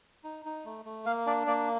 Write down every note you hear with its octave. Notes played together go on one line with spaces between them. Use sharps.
D#4
D#4
A3
A3
A#3 F5
D4 D5
A#3 D5